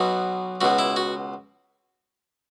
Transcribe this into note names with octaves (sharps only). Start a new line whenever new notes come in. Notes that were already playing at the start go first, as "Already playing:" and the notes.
Already playing: B1 B2 F#4
C#2 B2 F#4
E4
F#4